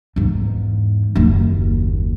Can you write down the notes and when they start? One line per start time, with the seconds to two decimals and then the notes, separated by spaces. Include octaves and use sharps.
0.16 E2 G#2
1.16 F#1 D#2